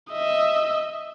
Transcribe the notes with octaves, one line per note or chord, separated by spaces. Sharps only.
D#5 E5